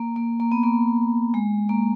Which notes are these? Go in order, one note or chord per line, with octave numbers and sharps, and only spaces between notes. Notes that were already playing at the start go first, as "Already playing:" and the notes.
Already playing: A#3
A#3
A#3
B3
A#3
G#3
A#3